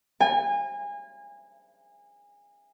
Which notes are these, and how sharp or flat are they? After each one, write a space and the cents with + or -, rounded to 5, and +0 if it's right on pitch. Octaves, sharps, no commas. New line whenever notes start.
G#5 -30